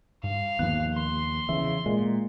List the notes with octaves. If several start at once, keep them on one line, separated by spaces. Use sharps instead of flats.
G2 F5
D#2 F3 B3 F#6
C6
E2 C#3 E3 E5
A#2 G#3